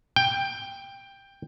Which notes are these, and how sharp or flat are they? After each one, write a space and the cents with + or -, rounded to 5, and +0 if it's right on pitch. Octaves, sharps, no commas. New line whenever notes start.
G5 +10